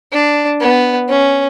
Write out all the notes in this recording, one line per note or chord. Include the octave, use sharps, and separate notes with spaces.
D4
B3
C#4